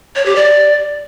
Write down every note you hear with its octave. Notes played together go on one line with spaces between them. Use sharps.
C#5
G4
D5